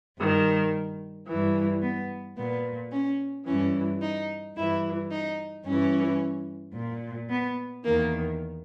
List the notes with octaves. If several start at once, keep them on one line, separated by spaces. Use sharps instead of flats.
G2 D#3
G2 E3
B3
A#2 B3
C#4
G2 E3 C#4
D#4
G2 E3 E4
D#4
G2 E3 C#4
A#2
B3
E2 D#3 A#3